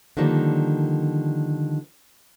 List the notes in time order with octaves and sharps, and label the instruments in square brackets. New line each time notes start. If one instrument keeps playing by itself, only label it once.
[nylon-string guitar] D3 D#3 F3 G3 A#3 D4